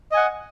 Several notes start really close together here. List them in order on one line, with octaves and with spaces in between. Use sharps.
D#5 G#5 F#5